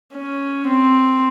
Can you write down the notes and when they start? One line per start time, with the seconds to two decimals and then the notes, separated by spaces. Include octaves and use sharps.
0.14 C#4
0.67 C4